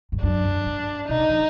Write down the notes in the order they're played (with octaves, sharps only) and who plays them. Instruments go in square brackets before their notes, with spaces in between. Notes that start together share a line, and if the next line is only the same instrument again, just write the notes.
[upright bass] G2
[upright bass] F#2 [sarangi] D4
[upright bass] G2
G#2
[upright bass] B2 [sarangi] D#4
[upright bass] C#3
F#3